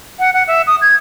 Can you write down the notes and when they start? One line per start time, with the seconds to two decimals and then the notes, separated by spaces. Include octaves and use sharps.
0.19 F#5
0.34 F#5
0.48 E5
0.67 D#6
0.82 G#6